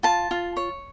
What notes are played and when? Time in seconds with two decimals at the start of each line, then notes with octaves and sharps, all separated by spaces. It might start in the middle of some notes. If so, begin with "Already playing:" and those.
0.03 F4 A5
0.31 F4
0.57 C#5